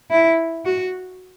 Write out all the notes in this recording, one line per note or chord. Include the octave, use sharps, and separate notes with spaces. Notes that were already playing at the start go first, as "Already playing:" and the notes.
E4
F#4